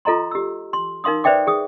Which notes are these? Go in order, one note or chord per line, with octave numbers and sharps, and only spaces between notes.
F4 A4 D#5 A#5 C6
G4 E6
C6
D#4 A#4 F5 C6 D#6
B4 C5 D5 E5 G5 D6
G#4 D#6